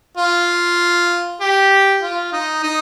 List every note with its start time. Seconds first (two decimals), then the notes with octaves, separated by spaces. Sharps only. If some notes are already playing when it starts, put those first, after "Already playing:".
0.17 F4
1.41 G4
2.02 F4
2.33 D#4
2.63 D#4